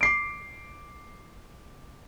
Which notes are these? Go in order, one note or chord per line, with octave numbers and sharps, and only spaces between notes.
D6 C7 D7